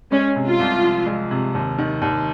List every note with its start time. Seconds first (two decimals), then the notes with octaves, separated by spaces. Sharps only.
0.12 G#3 C#4
0.36 C3
0.48 F4
0.60 C2
0.83 F3
1.06 G#3
1.31 C3
1.55 D#2
1.78 D#3
2.02 D#2